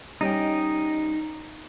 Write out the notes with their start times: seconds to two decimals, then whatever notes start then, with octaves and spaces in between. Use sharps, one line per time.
0.21 G3 C#4 D#4 D#5 G5